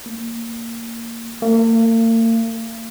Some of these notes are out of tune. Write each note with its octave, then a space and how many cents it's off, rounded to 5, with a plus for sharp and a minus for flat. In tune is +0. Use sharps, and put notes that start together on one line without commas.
A#3 -15
A#3 -45